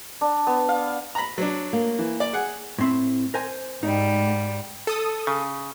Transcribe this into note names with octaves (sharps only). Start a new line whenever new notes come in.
D4
B3
F5
A#5 B5
F#3 D4
A#3
E3
D5 D6
G#4 F#5
A2 C4 E4
A#4 C5 G#5
G#2 G3 D#4
A4 D#6
C#3